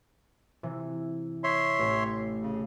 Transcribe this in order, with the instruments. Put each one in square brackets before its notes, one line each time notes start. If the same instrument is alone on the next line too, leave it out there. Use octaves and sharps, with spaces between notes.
[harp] C3 E3
[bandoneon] C#5 E5 C6
[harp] A1
[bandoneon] C#3